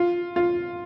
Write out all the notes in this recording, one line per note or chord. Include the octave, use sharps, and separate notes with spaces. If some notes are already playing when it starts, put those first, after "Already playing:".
Already playing: F4
F4